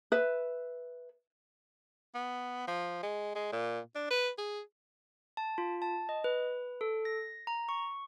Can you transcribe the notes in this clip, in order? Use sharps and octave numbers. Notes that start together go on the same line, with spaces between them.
B4 E5
B3
F3
G#3
G#3
A#2
D4
B4
G#4
A5
F4
A5
D#5
B4
A4
A#6
A#5
C#6